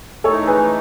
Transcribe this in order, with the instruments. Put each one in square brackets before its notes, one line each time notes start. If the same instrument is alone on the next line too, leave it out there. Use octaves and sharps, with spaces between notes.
[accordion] E3 A3 D#4 [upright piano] A4 C#5
[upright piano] G#4 B4